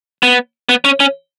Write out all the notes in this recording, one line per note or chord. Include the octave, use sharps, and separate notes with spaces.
B3
B3
C#4
C#4